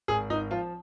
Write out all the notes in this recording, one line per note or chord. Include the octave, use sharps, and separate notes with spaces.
G#1 G#4
G#1 D#4
F3 F4